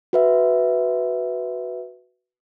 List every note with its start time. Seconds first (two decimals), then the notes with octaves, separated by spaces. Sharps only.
0.13 F#4 B4 E5